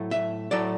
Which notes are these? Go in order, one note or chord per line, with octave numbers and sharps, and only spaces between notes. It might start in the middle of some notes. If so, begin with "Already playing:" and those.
Already playing: A2 F#3 A3
E5
A2 F#3 A3 D5